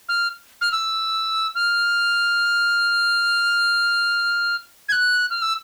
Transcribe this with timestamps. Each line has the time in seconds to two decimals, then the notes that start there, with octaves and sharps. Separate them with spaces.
0.09 F6
0.61 F6
0.72 E6
1.55 F6
4.89 G#6
4.92 F#6
5.30 F6
5.42 E6